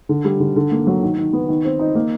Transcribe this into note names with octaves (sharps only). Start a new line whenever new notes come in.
D3
G3
D3
D3
A#3
F#3
D#3
D#3
B3
D#3
C4
D#4
A#3